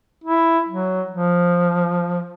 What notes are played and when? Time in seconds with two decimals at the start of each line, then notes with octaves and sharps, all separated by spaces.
0.24 E4
0.69 F#3
1.11 F3